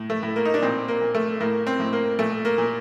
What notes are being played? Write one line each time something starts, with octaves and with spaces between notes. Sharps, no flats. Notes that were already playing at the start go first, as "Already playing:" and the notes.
Already playing: A2
A3
A2
A#3
D#4
D4
A#2 C4
A#3
A#2
A3
A2 A#3
C4
A2
A#3
A#2 A3
A#3
A#2